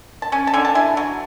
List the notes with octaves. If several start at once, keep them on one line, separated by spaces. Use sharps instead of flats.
A5
C#4 G#5
A5
D3 G#5
A5
E4 G#5
F#3